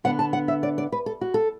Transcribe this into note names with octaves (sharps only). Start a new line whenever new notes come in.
D3 B3 D4 F#5
A5
F#5
E5
D5
D5
B4
A4
F#4
A4